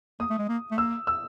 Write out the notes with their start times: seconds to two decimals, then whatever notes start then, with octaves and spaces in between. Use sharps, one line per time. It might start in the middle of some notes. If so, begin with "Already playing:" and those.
0.20 A#3 D#6
0.30 A3
0.39 G#3
0.48 A#3
0.71 A3
0.78 A#3 E6
1.07 E6